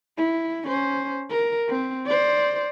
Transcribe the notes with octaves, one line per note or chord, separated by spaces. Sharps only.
E4
C#4 C5
A#4
C4
C5 D5